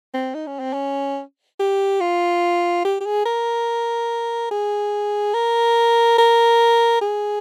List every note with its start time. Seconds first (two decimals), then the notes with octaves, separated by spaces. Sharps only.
0.14 C4
0.34 D#4
0.47 C#4
0.59 C4
0.73 C#4
1.59 G4
2.01 F4
2.85 G4
3.00 G4
3.05 G#4
3.25 A#4
4.51 G#4
5.34 A#4
6.18 A#4
7.01 G#4